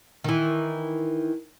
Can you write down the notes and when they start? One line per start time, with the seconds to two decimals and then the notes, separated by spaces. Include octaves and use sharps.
0.24 D#3 E3